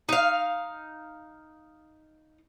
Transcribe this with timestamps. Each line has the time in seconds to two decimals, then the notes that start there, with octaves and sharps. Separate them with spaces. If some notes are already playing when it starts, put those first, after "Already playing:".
0.09 D#4 F5